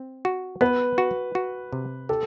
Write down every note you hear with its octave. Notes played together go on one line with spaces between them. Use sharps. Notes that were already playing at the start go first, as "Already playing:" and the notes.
Already playing: C4
F#4
B3 B4
F#4
F#4
C3
G4 A4